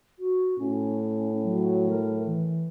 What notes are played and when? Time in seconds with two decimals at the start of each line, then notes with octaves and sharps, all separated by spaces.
0.19 F#4
0.58 A2 C#4
1.44 F#3
1.90 A#4
2.25 E3